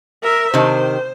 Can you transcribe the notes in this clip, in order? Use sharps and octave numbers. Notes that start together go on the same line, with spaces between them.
A#4 E5
C3 D#3 C5